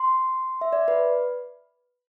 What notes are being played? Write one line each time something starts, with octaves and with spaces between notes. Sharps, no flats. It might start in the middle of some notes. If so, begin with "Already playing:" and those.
Already playing: C6
E5
D5
B4